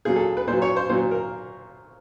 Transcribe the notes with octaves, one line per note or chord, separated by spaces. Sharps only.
A#2 F#3 G#4
A4
B4
A#2 F#3 C5
C#5
C5
A#2 F#3 C5
A#4